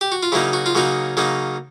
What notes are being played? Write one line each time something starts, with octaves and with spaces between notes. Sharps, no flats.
G4
F#4
F4
C#3 F#3 A#3 D#4 E4
F#4
F4
C#3 F#3 A#3 D#4 F#4
C#3 F#3 A#3 D#4